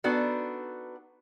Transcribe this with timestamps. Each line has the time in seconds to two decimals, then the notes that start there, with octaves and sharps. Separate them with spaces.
0.04 B3 D4 D#4 F#4 A4